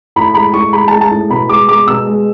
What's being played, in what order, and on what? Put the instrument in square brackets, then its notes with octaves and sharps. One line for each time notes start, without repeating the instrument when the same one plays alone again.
[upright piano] A2 B5
G#3 B5
A2 C#6
G#3 B5
A5
G#3
A5
A2
B2 B5
G#3 D6
G#3 D6
B2 E6
G#3